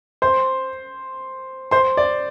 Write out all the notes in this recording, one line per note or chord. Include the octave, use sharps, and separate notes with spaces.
C5 C6
C5 C6
D5